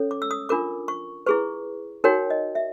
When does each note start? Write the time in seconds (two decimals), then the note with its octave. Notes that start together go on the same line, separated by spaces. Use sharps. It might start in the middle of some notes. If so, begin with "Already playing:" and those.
Already playing: C#4 A4 C#5
0.11 D6
0.22 E6
0.31 D#6
0.49 D4 F4 A#4 D6
0.88 C#6
1.26 E4 G#4 B4 C#6
2.04 D#4 F#4 A#4 C#5 G5
2.30 D#5
2.55 E5